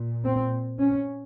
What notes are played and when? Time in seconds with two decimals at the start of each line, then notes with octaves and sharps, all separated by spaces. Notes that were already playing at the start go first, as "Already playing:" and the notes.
Already playing: A#2
0.24 C4
0.79 C#4